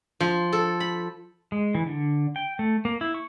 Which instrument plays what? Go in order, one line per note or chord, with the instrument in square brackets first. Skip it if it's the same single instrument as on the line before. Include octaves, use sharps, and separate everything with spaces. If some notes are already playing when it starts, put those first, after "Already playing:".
[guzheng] F3
A4
B5
[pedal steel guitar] G#3
E3
D3
G5
A3
A#3
E4
C#6